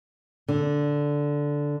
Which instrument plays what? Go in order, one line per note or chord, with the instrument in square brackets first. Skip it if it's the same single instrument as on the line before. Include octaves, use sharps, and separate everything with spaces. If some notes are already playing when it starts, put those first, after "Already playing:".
[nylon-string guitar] D3